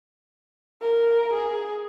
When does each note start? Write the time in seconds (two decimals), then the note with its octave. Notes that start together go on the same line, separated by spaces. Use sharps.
0.82 A#4
1.34 G#4